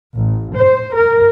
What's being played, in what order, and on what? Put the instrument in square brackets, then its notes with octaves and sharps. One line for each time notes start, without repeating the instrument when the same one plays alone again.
[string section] A1
C5
A#4